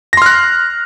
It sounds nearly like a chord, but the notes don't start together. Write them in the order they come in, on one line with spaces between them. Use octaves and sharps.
A#6 C6 F6 F#6